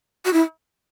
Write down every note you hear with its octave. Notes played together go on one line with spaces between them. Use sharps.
F#4
E4